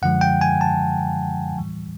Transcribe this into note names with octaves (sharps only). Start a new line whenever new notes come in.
F#2 D3 F3 G#3 F#5
G5
G#5
A5
A2 E3 G3